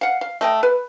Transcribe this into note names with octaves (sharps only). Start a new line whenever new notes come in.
F5 F#5
F5
A3 D#5 G5
B4